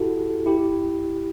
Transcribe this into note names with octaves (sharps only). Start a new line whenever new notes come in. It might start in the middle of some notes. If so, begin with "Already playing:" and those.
Already playing: E4 F#4 G4 A4
E4 G4